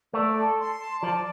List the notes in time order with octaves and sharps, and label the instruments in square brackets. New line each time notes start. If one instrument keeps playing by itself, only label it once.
[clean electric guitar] A3 [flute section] D5
[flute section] A4
C6
A5
[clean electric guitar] F3 [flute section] D5